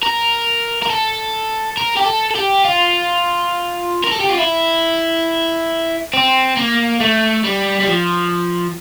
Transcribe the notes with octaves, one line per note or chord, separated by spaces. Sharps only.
A#4
A#4
A4
A#4
G4
A4
A4
G4
F4
A#4
A4
G4
F4
E4
C4
A#3
A3
G3
G3
F3